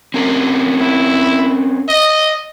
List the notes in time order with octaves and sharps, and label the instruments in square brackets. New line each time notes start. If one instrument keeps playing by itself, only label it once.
[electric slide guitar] C4 C#4 A#4
[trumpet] E4
D#5